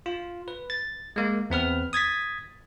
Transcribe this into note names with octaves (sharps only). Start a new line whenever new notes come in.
F4
B4
A6
G#3 A#3
E2 C4 B4 F6
D#6 G#6 A6 B6